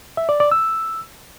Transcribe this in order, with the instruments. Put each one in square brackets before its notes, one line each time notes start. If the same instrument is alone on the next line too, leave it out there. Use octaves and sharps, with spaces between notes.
[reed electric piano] E5
D5
D5
E6